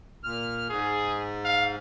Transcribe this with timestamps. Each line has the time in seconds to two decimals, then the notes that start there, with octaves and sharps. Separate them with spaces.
0.24 A#2 F6
0.70 G#2 G#4
1.45 F5